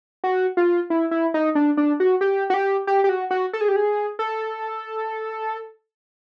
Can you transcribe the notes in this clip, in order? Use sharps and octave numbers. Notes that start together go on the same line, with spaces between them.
F#4
F4
E4
E4
D#4
D4
D4
F#4
G4
F#4
G4
G4
G4
F#4
F#4
A4
G#4
G4
G#4
A4